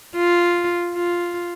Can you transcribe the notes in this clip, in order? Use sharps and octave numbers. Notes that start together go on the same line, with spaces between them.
F4
F4